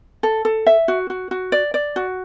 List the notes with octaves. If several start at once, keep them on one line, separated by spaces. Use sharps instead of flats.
A4
A4
E5
F#4
F#4
F#4
D5
D5
F#4